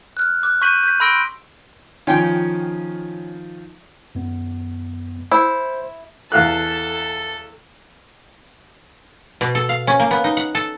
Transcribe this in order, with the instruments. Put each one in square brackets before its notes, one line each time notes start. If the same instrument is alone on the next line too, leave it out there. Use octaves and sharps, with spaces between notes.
[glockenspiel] F6 F#6
D6 F#6
C#6 F#6 G6 B6 D#7 F#7
G6 B6
B5 C6 E6 A#6 D7 G7
[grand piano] D#3 F3 [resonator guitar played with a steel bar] C#4 [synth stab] F4 G5
[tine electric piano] F#2 B3
[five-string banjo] E4 [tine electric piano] C5
[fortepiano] E2 F5 F#6 [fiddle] A4 A5
[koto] B2
A4
F5
C#4
A#3
B3
D#4
F#5
A4